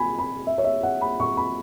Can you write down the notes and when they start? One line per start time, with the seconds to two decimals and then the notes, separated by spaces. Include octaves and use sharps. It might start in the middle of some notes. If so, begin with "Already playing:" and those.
Already playing: G#5 B5
0.19 B5
0.47 E5
0.58 C#5
0.64 E5
0.83 F#5
1.01 B5
1.20 C#6
1.37 B5